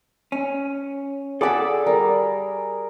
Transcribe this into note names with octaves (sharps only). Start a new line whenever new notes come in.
C#4
G#4 A4 D5 F#5 A5 B5 D6 E6
G3 A#4